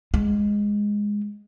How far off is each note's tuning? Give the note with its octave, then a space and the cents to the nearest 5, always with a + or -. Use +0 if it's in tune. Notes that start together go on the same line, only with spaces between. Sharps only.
G#3 -10